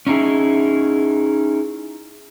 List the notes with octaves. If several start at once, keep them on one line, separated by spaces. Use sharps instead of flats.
C#4 D#4 E4 G#4